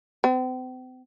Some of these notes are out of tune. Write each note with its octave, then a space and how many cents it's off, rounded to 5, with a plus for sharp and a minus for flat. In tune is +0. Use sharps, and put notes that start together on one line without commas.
C4 -40